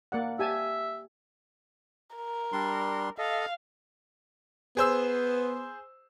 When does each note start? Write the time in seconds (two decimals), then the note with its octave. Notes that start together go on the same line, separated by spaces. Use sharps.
0.12 A#3 D5 F#5
0.39 G4 E5 G#5 A5
2.16 A#4
2.52 G3 D4 C6
3.18 A4 D#5 F5
4.77 B3 G#4 C5 E6